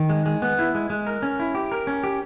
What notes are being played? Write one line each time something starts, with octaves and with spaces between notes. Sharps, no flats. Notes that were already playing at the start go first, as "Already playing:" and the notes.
Already playing: D#3
G#3
G#3
B3
E4
G#3
G#3
A#4
C#4
E4
G4
A#4
C#4
G4